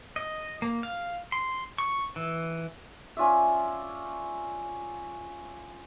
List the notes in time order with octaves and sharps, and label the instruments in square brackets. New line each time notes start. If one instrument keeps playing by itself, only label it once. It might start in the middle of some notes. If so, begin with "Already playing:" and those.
[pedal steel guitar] D#5
A#3
F5
C6
C#6
E3
[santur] C#4 F4 D5 E5